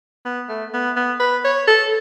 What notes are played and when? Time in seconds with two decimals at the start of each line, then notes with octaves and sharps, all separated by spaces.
0.25 B3
0.49 A3
0.74 B3
0.97 B3
1.20 B4
1.45 C#5
1.67 A4